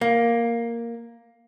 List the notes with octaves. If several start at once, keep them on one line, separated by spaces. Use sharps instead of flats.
A#3